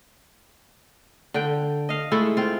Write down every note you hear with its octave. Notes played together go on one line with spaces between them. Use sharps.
D3 G5
D#5 F5
G#3 A3 E4 A4
C4 F4